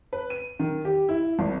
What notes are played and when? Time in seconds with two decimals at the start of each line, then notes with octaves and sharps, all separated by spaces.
0.13 B4
0.30 D#7
0.60 D#3
0.85 G4
1.09 E4
1.39 G#1